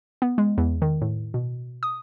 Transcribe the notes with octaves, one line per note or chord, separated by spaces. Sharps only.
B3
G#3
E2
D#3
A2
B2
D#6